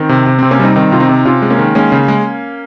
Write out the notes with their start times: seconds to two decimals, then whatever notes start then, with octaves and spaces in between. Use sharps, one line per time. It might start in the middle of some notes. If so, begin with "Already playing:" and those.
Already playing: D#3 C4
0.09 C3
0.26 C3
0.39 C3 C4
0.51 A#3 C#4
0.59 G3 C4 D#4
0.76 D#3 C4 D#4
0.92 C3 F4
1.00 C4 D#4
1.09 C3
1.25 C3 C#4 F4
1.42 G#3
1.50 A#3 C#4
1.59 D#3
1.75 G#3 A#3 C#4
1.92 C#3
2.08 G#3